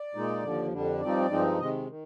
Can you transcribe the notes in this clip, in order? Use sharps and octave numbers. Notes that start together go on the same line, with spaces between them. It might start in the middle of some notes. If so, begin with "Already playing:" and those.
Already playing: D5
A#2 G#3 D#4
D#2 D3 F3
F2 D3 G3 D4
G2 F3 C4 D#4 D5
G2 F3 G#3 C4 D#4
C3 D#3 G#3 D#5
D#3